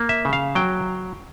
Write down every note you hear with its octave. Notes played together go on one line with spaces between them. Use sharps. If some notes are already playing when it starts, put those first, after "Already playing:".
Already playing: A#3
E5
C#3
F5
F#3 G5